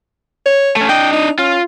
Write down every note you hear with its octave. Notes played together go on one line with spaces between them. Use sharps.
C#5
A3 C#4
D4 D#5 G5
D#4
C#4 F4